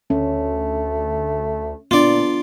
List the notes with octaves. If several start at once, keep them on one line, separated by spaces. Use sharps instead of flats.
D2 A3 C#4
A#2 B3 D4 F4 D5